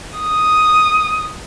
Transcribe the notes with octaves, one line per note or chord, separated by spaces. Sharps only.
D#6